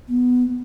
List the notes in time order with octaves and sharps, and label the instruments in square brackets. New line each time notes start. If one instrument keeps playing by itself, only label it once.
[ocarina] B3